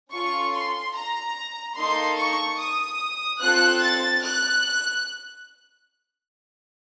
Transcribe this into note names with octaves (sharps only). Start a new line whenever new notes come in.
C#4 F4 A4 C#6
C6
A#5
A#3 D#4 A4 C6
C#6
D#6
C4 F4 A4 F#6
A6
F#6